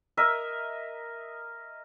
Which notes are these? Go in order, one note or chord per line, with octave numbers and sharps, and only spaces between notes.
A#4 D#5 E5